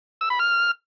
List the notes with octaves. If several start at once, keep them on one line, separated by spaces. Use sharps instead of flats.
E6
B5
F6